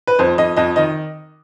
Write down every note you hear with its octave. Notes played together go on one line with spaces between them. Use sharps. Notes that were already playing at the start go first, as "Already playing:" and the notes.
B4
F2 C5
F2 D#5
F2 D#5
D#3 D#5